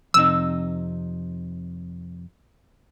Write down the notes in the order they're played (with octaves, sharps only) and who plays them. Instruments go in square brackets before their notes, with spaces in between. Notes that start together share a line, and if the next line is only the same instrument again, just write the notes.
[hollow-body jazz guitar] F2 C3 D#4 [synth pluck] E6